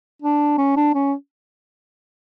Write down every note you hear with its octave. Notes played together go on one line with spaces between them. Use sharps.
D4
C#4
D4
C#4